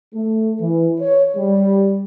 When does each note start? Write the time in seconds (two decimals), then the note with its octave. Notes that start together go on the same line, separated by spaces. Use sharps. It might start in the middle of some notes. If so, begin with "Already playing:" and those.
0.13 A3
0.59 E3
0.99 C#5
1.36 G3